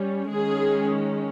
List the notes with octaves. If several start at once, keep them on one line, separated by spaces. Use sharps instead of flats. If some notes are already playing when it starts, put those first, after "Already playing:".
Already playing: G3 C#4
D#3 G#3 C#4 G#4